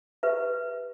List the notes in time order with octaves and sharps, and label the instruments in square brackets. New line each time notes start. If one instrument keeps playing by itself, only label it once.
[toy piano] G4 B4 E5